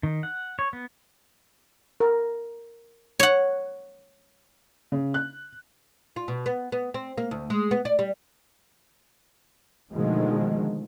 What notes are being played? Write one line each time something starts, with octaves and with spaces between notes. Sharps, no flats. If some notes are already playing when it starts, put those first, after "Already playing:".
D#3
F#5
C#5
B3
A#4
C#5 F#5
C#3
F#6
F4
B2
B3
B3
C4
A#3
D2
G#3
B3
D5
G3
B2 D3 D#3 F3 G#3 A3